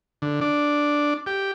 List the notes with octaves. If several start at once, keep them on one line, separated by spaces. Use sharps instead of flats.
D3
D4
G4